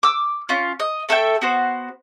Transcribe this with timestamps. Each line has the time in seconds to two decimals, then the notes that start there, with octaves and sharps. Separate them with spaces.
0.03 D6 E6
0.49 C#4 F4
0.80 D#5
1.09 A3 A4 E5 G5
1.42 B3 F#4 C5